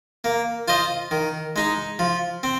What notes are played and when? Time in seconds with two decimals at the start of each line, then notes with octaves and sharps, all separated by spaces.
0.24 A#3
0.68 F4 C5 D#5
1.11 D#3
1.56 G#3 D#4
1.99 F3
2.43 C4